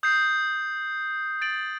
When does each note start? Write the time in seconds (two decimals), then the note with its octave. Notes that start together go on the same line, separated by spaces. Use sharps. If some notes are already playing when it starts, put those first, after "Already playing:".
0.03 D#6 G6 C7
1.41 A6 D7 F#7